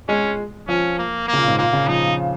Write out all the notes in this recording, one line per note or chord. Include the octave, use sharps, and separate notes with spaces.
G#3 C#4
F3 C#4
A#3
A#3
C#3
A#2
G#2
A#2 A#3
C#3
F3 D#4